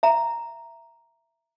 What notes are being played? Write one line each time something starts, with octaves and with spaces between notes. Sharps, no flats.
E5 A#5